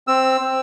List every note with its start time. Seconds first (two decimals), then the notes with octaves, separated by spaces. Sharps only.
0.07 C4 E6
0.41 C4